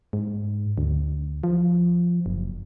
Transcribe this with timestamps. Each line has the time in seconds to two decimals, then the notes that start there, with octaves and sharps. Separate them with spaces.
0.13 G#2
0.78 D2
1.44 F3
2.26 F#1